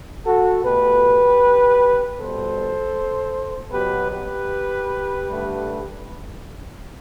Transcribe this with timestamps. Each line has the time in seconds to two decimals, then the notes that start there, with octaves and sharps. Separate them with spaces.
0.26 F#4 A4
0.64 B2 A3 G4 B4
2.18 B2 G3 B3 A4 C5
3.72 B2 F#3 B3 G4 B4
4.11 G4 B4
5.27 G2 D3 A3